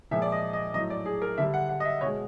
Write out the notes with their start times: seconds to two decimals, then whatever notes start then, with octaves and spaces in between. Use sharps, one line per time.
0.11 A#2 F3 G#3 E5
0.22 D5
0.32 D#5
0.53 D#5
0.74 F#3 D#5
0.78 A2
0.90 D5
1.06 G#4
1.22 A#4
1.38 D3 G3 E5
1.54 F#5
1.69 F#5
1.80 D#5
1.85 E5
2.01 B2 G#3 C#5